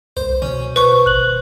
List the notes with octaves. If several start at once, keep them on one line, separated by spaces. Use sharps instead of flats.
C2 C5
B2 C#4
B4 C5 C#6
G#1 F#6 F#7